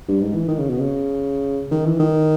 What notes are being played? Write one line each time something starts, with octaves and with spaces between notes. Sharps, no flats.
G2
G#2
E3
D#3
C#3
B2
C#3
D#3
E3
D#3